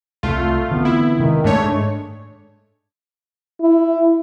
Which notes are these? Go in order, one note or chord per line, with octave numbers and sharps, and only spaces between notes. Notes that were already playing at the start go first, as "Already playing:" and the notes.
C2 A3 F4
D3 E3 B3 C4
E4
C3 D#3 G#3
G#2 G#3 A3 D4 C#5
E4